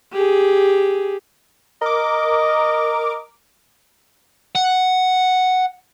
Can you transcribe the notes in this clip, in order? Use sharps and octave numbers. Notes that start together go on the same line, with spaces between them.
G4 G#4
A#4 D#5 D6
F#5